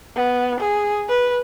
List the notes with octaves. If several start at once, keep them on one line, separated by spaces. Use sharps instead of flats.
B3
G#4
B4